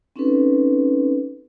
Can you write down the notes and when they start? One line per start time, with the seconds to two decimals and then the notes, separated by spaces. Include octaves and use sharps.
0.16 C4 C#4 D#4 F#4 A4 B4